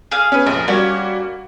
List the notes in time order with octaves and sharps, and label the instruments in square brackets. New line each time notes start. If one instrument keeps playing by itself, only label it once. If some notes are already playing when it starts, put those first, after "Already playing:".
[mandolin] G#4 F5
[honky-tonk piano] C#4 B4
F1 A#1
[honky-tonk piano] G3 F#4 [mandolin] A#3 C#4 C#5